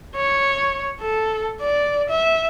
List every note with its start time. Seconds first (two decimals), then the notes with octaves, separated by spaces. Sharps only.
0.15 C#5
1.01 A4
1.61 D5
2.09 E5